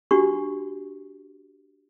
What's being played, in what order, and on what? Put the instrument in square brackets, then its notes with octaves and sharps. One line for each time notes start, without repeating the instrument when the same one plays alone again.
[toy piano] D4 F#4 G4 C#6